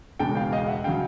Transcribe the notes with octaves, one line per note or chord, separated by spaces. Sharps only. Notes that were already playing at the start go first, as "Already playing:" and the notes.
E1 E2 C#3 G5 A5
F5 G5
D#5 F5
E5 F#5
C#3 F#3 F5 G5